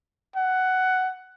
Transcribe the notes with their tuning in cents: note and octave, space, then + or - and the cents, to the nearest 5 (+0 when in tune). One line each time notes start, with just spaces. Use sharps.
F#5 +10